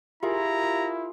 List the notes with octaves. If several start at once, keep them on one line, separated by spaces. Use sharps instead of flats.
E4 F4 G4 G#4 A#4 E5 F5 A#5